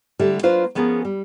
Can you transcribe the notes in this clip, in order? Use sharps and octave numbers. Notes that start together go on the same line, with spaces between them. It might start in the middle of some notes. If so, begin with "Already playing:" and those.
D3 G3 A3 G4
F#3 A#3 D4 F4 B4 C5
F3 B3 C#4 G#4 A#4
G3